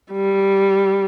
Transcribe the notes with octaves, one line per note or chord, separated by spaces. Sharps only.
G3